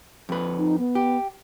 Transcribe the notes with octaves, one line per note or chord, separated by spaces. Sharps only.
F2 B4
D#4
B3
G4